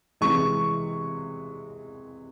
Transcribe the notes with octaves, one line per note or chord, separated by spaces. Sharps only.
C3 E3 G#3 C#6